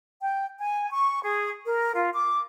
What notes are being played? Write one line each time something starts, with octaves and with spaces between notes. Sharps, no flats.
G5
G#5
C#6
G#4
A#4
F4
D6